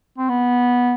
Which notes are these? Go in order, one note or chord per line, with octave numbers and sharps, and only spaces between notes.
C4
B3